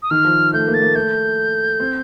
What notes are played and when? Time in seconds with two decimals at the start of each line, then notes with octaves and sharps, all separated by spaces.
0.03 D#6
0.11 D#3 F6
0.24 F3
0.53 A3 G6
0.67 A#3
0.74 A6
0.81 A#3
0.95 A3 G6
1.80 C4